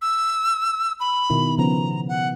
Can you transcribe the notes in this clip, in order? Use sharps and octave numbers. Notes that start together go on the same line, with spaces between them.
E6
B5
B2 D#3 E4
C#3 F3 B3 A#5
F#5